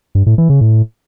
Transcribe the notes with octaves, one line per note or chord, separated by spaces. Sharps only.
G2
A2
E3
C#3
A2